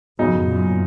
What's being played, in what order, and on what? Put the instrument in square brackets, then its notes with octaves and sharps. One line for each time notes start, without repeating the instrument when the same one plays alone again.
[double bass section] F2 G#2 [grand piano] C#3 F#3 B3 D#4
[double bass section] F#2 A#2